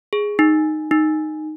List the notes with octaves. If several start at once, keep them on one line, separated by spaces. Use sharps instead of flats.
G#4
D#4
D#4